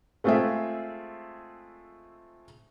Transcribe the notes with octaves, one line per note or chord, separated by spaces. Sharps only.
G#3 A3 C4 F4 G#4 E5